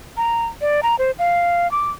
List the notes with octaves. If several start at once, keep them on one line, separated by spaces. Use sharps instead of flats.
A#5
D5
A#5
C5
F5
D6